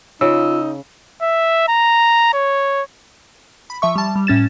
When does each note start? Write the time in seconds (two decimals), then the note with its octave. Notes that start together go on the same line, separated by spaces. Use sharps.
0.21 C#3 D#4 F4 E6
1.22 E5
1.69 A#5
2.34 C#5
3.70 B5
3.82 F3 E5 C#6
3.96 G3 A5
4.16 G3
4.27 A2 C#4 A6 E7